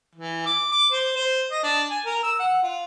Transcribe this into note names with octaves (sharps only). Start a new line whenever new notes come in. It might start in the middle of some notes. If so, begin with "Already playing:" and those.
E3
D6
D6
C5
C5
D#5
D4
G#5
A#4
E6
F#5
F4